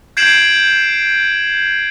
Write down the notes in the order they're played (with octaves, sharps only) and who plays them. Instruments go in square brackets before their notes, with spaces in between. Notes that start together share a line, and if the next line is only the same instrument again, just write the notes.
[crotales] G6 G#6 C7 D7 E7 F#7